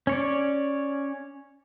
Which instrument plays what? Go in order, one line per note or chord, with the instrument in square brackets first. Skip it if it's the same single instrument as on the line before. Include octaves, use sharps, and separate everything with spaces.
[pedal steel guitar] C#4 C#5 D5